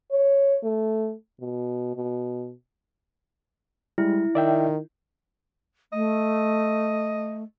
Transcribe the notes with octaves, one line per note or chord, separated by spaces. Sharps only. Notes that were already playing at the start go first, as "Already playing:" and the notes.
C#5
A3
B2
B2
G3 G#3 E4
D#3 D5 E5 G5
A3 D#5